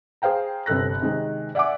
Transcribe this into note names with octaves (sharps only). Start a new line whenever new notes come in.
G#4 C5 F5 G5 A#5
G1 C3 A4 F#6 A#6
C3 D#3 G#3
D5 E5 F#5 G#5 D6